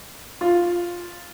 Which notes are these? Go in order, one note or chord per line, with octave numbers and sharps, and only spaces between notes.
F4